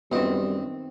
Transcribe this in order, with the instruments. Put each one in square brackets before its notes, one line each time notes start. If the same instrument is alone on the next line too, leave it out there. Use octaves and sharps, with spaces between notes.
[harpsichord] F#2 D#5 [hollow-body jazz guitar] D#3 C4 [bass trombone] G3 [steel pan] B3 F4